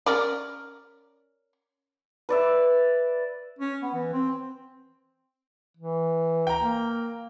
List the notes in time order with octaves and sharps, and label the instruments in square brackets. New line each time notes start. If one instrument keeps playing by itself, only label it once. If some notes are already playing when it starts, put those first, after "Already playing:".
[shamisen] C#4 A#4 D5
[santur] B4 D5 E5
[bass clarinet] C#4
B3
E3
C4
[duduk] E3
[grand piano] G5 A#5
[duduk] A#3